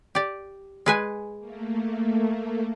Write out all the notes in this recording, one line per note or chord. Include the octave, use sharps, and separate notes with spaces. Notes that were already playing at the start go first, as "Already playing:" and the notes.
G4 D5
G#3 B4 G#5
A3 A#3